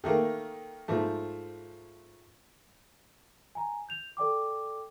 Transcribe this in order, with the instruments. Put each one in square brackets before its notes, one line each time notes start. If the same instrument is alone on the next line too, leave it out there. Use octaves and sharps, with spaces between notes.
[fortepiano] D#3 A3 A#3
G#2 F3 A3
[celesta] G#5 A#5
G6 F7
A4 D5 G5 D6